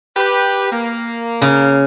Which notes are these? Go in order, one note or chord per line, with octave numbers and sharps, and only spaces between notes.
G4 B4
A#3
C#3